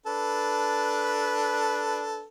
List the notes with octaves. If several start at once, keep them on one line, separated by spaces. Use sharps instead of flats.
D4 A4 B4